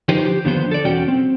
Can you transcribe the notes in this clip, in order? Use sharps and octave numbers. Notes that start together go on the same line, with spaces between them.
D3 F3 D#4 G4 B4 C5
G4
D#2 D3 F3 B3 C5
A4 D5
B1 E2 C#4 F#4 G5
C4